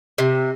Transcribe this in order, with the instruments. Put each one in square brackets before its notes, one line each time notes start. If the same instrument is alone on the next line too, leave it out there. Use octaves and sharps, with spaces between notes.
[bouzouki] C3